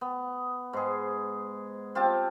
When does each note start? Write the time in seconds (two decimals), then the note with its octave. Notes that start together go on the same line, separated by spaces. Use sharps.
0.01 B3
0.73 G#2 G#4
1.95 C4 F4 G4 A5